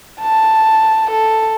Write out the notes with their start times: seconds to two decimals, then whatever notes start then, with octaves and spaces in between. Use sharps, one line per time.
0.21 A5
1.10 A4